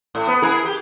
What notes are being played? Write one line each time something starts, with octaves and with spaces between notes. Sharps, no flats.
A2
B3
E4 G#4 A#4
G4